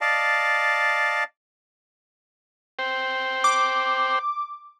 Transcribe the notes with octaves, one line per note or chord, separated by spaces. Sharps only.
D5 D#5 F5 A5
C5 G5
D6